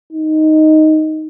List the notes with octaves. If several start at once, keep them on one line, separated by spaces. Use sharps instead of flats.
D#4